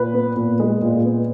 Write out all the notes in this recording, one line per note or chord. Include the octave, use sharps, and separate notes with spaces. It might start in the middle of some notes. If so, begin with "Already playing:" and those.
Already playing: A#2 B4
B3
A#2
G#3
A#2
B3